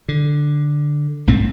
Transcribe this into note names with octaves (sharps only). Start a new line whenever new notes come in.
D3
B1 G#2 A3 C4